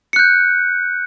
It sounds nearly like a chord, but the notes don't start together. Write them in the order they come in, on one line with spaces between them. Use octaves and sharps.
C#7 F#6 G6